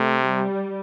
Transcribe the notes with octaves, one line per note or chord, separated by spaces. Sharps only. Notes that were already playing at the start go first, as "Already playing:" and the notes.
Already playing: C3 A3
G3